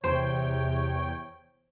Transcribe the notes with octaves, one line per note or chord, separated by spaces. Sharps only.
E2 C3 C5 C#5 G5